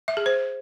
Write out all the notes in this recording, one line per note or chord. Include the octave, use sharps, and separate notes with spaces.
E5
G#4
C5